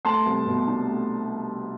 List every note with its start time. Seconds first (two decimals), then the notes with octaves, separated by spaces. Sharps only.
0.05 A3 A5 C6
0.26 C2
0.46 B2
0.68 D4
0.87 A3